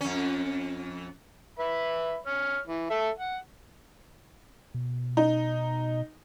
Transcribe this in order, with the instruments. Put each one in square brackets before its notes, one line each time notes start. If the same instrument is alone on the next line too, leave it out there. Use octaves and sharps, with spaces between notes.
[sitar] F2 C#4
[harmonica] B4 E5 B5
C#5 F6
E3
A4 E5
F#5
[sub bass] B2
[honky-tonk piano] D#4